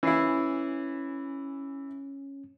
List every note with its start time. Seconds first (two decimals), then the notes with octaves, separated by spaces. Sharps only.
0.03 E3 C#4 E4 C7